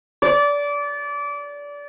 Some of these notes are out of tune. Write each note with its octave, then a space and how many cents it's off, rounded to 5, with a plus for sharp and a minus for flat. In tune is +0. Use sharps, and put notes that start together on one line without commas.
D5 -25